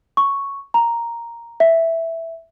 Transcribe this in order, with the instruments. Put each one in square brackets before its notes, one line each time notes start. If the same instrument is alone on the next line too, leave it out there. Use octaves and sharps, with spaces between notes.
[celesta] C#6
A#5
E5